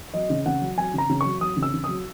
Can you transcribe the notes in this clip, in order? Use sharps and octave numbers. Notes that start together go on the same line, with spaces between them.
F#3 D#5
C#3
C#3 F#5
F#3
F#3 G#5
C#3 A#5
C#3
F#3 C#6
F#3 D#6
C#3
E6
C#3
F#3 D#6